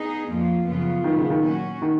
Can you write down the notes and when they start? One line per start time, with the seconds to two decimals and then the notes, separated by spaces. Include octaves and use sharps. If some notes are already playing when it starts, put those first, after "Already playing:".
Already playing: B3 D#4 G#4
0.28 F2 F3 A#3 F4
0.66 F#2 C#3 F3 B3 F4
1.04 A#2 D#3 F#3 B3
1.18 C#3
1.30 D#3
1.43 F#3 C#4 F#4
1.82 D#3